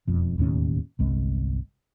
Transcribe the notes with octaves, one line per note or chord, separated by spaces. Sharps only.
E1 F2
E1 D#2 A2 C#4
G1 C2 G#3